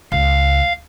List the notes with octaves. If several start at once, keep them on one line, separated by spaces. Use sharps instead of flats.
C#2 F5